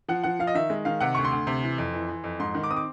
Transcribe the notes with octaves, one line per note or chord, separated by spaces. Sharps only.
F3 F#5
F3 F#5
F3 F5
D#5
D#3 E5
G#3
D#3 F5
C3 F#5
D2 C#6
C6
D2
C3
E3
F2
E3
E3
F2
G#2 C6
D#3
D6
C4 D#6
D6